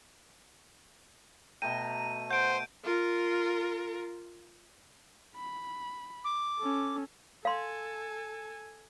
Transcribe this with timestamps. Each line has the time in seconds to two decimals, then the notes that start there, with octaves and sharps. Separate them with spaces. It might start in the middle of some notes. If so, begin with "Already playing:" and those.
1.62 B2 A3 G5 A#5 D#7
2.31 C5 F#5 G6 D7
2.84 F4 A#4
5.35 B5
6.24 D6
6.59 C#4 A4
7.45 A4 F5 G#5 C6